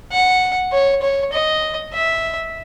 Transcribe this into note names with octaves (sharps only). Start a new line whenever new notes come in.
F#5
C#5
C#5
D#5
E5